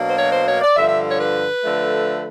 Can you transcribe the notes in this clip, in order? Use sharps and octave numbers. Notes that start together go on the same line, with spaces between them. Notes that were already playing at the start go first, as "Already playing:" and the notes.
Already playing: B2 F#3 A#3 D4
C5
C#5
C5
C#5
D5
G2 D3 F3 E5
E5
C#5
B4
D3 F3 A3